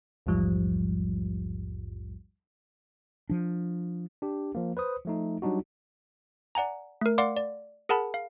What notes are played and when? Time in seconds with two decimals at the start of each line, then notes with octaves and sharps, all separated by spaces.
0.26 A#1 E2 G#2 F3 G3
3.30 F3 D4
4.22 D4 G4
4.55 F3 A#3
4.77 B4 C5 D#6
5.05 F3 A3 D#4
5.42 F#3 G3 D4 D#4 F#4
6.55 D5 F#5 G#5 A#5
7.01 A3 A#4
7.18 D5 F5 F#5 C6 D6
7.37 D5
7.89 G#4 A#4 F#5 A5 B5
8.14 F5